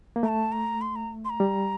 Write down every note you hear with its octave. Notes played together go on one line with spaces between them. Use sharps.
A#3
A3 A#5
A5
A#5
C6
A#5
C6
A#5
G3